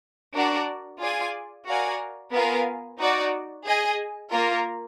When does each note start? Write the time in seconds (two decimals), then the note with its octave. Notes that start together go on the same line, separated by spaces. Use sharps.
0.34 D4 F#4 A#4 D5
1.00 F4 G#4 D5 G#5
1.66 F#4 A#4 D5 F5 G#5
2.32 B3 F4 A#4 F5 G#5
2.98 D#4 F#4 D5
3.64 G#4 D#5 G#5
4.30 A#3 F4 A#4